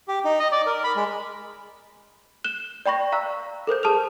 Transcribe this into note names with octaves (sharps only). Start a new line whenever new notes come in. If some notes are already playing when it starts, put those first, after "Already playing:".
G4
D#4
D#5
D5
A#4
B5
G#3
F#6 E7 G7
D5 G5 B5 C#6 A#6
F5 A#5 E6 F#6
A4 A#4 C5 G6
G#4 A5 D#6 F6 F7